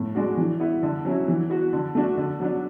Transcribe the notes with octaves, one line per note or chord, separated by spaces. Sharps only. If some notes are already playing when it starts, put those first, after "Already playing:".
Already playing: A2
G#3 D4 F#4
E3
B3 E4
D3
F#3 C#4 E4
E3
B3 F#4
D3
A3 D4 F#4
D3
F#3 B3 D4